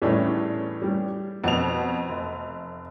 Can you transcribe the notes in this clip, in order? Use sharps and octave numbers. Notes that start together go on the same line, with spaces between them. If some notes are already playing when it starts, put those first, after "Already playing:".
E2 A2 G3 C#4 D4
G3
F2 B2 F#5 F7
F1